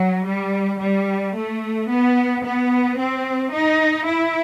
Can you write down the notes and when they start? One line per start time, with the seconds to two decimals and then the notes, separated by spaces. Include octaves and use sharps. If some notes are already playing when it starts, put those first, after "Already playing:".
Already playing: F#3
0.26 G3
0.81 G3
1.35 A3
1.89 B3
2.44 B3
2.98 C4
3.52 D#4
4.06 E4